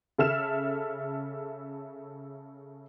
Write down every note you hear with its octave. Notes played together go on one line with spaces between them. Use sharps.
C#3 A4 E5 F6 E7